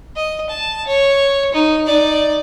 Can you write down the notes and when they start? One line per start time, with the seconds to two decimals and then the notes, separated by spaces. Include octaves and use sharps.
0.16 D#5
0.50 A5
0.87 C#5
1.54 D#4
1.87 D#4 D5